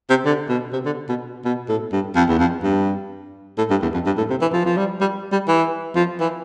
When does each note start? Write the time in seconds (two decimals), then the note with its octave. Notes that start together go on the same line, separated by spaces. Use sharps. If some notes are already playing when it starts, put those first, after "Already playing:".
0.10 C3
0.25 D3
0.49 B2
0.73 C3
0.85 D3
1.09 B2
1.45 B2
1.69 A2
1.92 G2
2.16 F2
2.29 E2
2.39 F2
2.63 G2
3.58 A2
3.70 G2
3.82 E2
3.94 F2
4.06 G2
4.18 A2
4.30 C3
4.41 E3
4.53 F3
4.65 F3
4.77 G3
5.01 G3
5.32 G3
5.48 E3
5.96 F3
6.20 E3